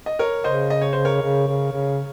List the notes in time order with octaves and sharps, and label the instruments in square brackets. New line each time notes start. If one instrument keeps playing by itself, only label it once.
[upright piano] D#5
A#4 C#5
[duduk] C#3 [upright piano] C5 D#5
[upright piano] D#5
C#5
C5
A#4 C#5
[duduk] C#3
C#3
C#3